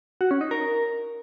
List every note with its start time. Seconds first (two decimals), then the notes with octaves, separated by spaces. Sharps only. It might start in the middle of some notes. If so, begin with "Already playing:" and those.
0.21 F#4
0.31 C#4
0.41 D#4
0.51 A#4